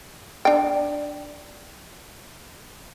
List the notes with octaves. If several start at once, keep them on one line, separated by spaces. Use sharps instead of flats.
D4 G5